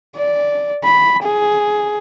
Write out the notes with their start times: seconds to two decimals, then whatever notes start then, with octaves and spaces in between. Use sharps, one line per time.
0.16 D5
0.83 B5
1.23 G#4